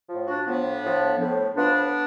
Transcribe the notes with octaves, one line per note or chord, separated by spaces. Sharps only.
A2 F3
D4 F#4
A2 F3 B3 D4
A2 F3
A2 F3
A2 F3 B3 D4